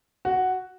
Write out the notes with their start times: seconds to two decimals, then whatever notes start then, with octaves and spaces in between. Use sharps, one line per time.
0.25 F#4